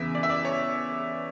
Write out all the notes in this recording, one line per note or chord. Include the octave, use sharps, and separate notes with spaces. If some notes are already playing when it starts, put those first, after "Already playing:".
Already playing: E2 C#3 E3 E5
D5
E5
D5
C#5